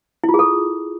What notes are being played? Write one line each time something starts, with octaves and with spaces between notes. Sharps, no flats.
E4
F4
G#4
A4